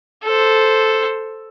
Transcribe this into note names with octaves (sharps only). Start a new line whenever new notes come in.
A4 C5